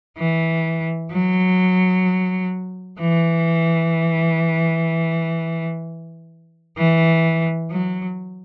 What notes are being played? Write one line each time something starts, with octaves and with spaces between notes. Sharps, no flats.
E3
F#3
E3
E3
F#3